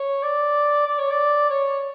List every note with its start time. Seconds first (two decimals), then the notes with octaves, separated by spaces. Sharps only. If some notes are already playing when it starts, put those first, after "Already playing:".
Already playing: C#5
0.22 D5
0.87 D5
0.98 C#5
1.10 D5
1.50 C#5